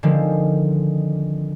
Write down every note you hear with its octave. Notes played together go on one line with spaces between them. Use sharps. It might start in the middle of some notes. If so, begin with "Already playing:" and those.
D3 D#3 F3 G#3 C4